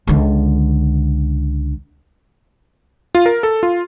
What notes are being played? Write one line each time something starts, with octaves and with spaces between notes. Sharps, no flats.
C#2 D3
F4
A#4
A4
F4